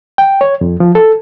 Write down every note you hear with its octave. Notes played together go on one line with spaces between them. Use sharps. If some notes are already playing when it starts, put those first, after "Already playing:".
G5
C#5
F2
F3
A4